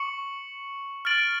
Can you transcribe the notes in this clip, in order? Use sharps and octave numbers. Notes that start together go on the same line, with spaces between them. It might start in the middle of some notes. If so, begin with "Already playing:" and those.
Already playing: C#6 C#7 F#7
F6 A6 D7 F#7